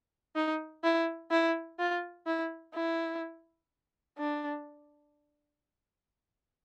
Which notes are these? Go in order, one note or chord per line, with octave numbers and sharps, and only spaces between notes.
D#4
E4
E4
F4
E4
E4
D4